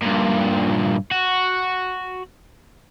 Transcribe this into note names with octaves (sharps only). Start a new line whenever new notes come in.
G2 A#2
F#4